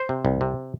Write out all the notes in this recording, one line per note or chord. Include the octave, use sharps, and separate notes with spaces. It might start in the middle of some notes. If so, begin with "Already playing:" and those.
Already playing: C5
C3
C2
C3